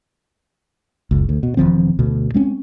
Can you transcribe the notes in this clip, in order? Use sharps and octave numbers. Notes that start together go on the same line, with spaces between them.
F#1 C#2
D2
B2
E1 D#3 F3 C4
D2 B2
G#3 C4 C#4